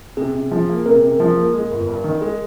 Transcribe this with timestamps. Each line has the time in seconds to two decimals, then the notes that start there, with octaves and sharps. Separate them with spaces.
0.17 C3 G#4
0.35 C3
0.51 F3 G#4
0.69 A#3
0.85 C3 A#4
1.03 C3
1.20 F3
1.37 A#3
1.54 G#3
1.71 G1
1.88 G2
2.04 D#3
2.21 G#3 G#4